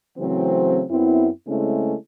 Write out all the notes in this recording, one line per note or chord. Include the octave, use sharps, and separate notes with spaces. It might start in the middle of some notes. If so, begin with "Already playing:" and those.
C#3 E3 F#3 A3 C4
F#2 B3 C4 E4
C#3 G#3 A3 C4 C#4 E4